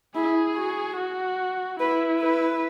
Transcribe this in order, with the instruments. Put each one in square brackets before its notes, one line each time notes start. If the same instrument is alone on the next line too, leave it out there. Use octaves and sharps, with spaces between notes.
[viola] E4 [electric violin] G#4
[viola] F#4
[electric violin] F#4
[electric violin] E4 [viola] B4
[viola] B4